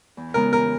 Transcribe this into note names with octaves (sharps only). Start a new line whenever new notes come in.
E2
C#3 G#3 B3 D#4 A#4
E2 A#4